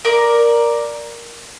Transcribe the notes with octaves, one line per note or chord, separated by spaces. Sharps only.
A#4 D5